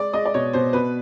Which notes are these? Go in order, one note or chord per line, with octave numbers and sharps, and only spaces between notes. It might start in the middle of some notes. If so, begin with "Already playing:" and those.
Already playing: G#3 D5
G#3 D#5
D5
B2 C#5
B2 C5
B2 B4